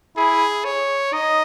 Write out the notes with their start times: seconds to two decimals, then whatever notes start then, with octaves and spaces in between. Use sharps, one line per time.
0.17 E4 G#4
0.65 C#5
1.13 D#4 D#5